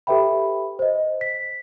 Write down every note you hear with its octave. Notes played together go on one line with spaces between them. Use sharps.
G4 A4 B4 E5 G5 B5
C5 D#5
B6